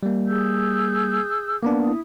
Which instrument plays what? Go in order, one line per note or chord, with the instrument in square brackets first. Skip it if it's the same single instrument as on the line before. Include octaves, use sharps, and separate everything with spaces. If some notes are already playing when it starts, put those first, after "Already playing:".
[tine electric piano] G3 A#3
[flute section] G#4 E6 G6
[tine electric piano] A#3 B3 D4 [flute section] D6
[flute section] E4 D#6